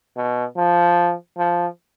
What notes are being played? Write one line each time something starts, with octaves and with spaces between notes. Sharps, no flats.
B2
F3
F3